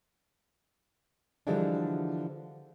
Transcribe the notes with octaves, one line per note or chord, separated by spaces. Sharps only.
D3 E3 F3 G3 G#3 D4